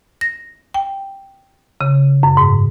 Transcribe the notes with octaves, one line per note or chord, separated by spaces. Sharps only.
A#6
G5
C#3
F#2
G#2